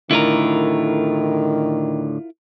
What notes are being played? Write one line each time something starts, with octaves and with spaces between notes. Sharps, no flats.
A2 D3 D#3 E4 F4 A#4